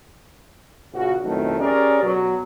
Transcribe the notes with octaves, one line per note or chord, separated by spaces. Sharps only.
A#1 C#3 F#4
B1 F2 A2 D#3 A3
C#4 G4 G#4 A#4 C#5 D5
B2 F#3